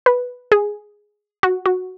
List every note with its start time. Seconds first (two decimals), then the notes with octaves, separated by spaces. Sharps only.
0.06 B4
0.52 G#4
1.43 F#4
1.66 F#4